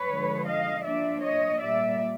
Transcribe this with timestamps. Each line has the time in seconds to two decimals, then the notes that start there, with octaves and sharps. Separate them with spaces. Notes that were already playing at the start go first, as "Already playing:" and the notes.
Already playing: B4 C#5
0.09 D3 F3 G#3
0.47 D#5 F5
0.84 F3 A#3 D4 D5 E5
1.22 C#5 D#5
1.59 A#2 G3 A#3 D5 E5